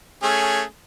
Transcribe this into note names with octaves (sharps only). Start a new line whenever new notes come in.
A3 C#4 G#4